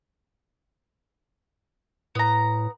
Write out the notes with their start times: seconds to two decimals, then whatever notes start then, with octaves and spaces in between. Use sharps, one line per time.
2.15 A2 B3 A#5